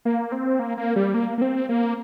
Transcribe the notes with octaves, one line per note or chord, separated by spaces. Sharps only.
A#3
C4
A#3
A#3
G3
A#3
A#3
C4
A#3